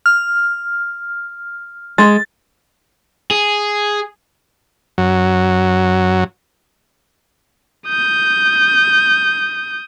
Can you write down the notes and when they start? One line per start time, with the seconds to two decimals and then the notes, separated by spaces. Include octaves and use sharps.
0.06 F6
1.98 G#3 A6
3.31 G#4
4.98 F#2 F#3
7.88 D#6 G6